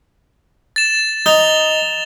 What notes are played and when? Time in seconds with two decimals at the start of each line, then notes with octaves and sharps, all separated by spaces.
0.76 A6 E7
1.26 D#4 F7 G7